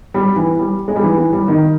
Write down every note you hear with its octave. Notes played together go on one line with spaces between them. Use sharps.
G3
E3
G3
G#3
G3
E3
E3
G3
D#3